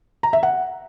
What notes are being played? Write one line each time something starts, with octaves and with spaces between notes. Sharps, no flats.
A#5
E5
F#5